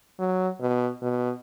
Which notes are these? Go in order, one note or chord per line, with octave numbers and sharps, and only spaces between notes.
F#3
B2
B2